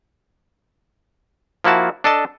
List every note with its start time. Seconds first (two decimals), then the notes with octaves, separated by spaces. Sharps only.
1.64 F3 A#3 E4 F#4 A5
2.04 D4 A4 D#5 A5